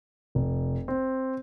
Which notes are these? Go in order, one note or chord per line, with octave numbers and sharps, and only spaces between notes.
F1
C4